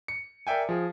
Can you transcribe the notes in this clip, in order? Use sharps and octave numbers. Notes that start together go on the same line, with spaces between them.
C#7
A#4 D5 E5 G5 G#5
F3 G#4